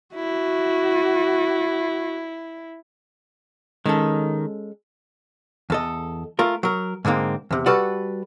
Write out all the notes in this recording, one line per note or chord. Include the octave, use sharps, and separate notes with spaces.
E4 F#4
D#3 G#3 C#4 A4
E2 A4 D#5
A3 F4 A#4
F#3 A#4
G#2 D3 G#3 A#3 C4
E2 C3
G3 F#4 A4 B4 D5 F#5